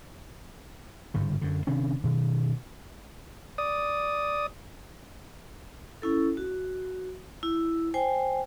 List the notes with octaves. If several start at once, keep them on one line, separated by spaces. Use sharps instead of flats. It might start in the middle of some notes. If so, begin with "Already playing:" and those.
G1 G#2 C#3
F#2 D3
C3 D#3 C#4 D4
B2 D#3
D5 D#6
C#4 E4 A4
F#4
E4
C5 G5 G#5